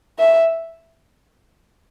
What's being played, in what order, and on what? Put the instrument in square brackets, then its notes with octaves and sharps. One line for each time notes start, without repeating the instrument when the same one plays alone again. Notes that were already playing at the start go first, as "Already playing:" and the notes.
[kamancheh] E5